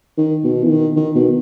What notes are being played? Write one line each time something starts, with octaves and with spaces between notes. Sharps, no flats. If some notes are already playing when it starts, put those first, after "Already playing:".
D#3
B2
E3
D#3
D#3
B2